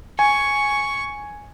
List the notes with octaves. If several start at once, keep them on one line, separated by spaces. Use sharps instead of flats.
G#5 C#6